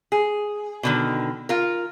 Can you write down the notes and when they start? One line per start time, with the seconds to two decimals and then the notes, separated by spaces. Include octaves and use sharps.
0.12 G#4
0.83 B2 D3 D#3
1.49 F4 A#4